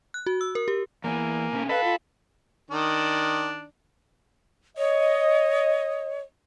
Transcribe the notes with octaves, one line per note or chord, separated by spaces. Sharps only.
F#6
F#4
E6
A#4
G4
E2 E3 A#3 G#5
B2 C#4
A4 B4 D#5 F5 B5
F4
D#3 D4
C#5 D#5